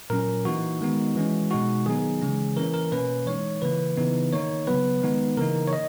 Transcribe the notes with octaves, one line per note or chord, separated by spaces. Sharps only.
A#2 F#3 C#4 A#4
E3 A#3 D#4 F#4
D#3 G#3 B3 D#4
E3 G#3 C#4
B2 G#3 D#4 F#4
D#3 F#3 B3 D#4 G#4
C#3 E3 G#3 C#4
E3 A#3 C#4 A#4
A#4
B2 A#3 C#4 B4
E3 G#3 D#4 C#5
C#3 E3 A#3 B4
C#3 E3 B3 D#4
D#3 A#3 D#4 C#5
C#3 F#3 B3 B4
D#3 G#3 B3 D#4
C#3 E3 A#3 D#4 A#4
C#5
D#5